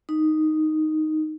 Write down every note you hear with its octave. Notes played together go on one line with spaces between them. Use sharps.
D#4